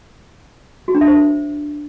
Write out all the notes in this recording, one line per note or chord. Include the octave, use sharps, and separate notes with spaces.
F#4
D4
E5
C5